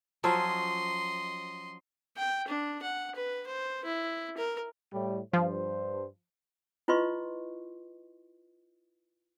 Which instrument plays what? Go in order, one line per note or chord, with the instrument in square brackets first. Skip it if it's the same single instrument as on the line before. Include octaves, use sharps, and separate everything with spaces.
[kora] F3 F#3 C#4 [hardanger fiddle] D#5 C6
[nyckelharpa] G5
D4
F#5
B4
C5
E4
A#4
[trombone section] A2 G3
[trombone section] G2 C5 [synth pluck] F3
[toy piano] E4 F4 B4 D#5 C6 C#6